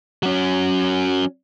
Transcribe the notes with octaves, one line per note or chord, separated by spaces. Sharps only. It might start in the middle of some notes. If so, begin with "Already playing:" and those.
F#3 C#4